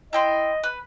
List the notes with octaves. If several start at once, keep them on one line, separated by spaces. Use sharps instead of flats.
E4 D#5 G5 C6
B4